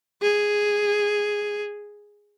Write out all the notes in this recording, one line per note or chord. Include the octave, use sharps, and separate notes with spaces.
G#4